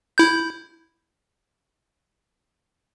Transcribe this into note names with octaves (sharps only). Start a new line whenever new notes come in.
E4 G6